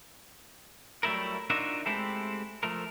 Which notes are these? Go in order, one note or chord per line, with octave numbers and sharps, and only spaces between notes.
F#3 G3 A3 E4 A#4
D4 D#4 F4 F#4 A#4 E5
G#3 A3 C4 E4 G4 A4
F3 A3 A#4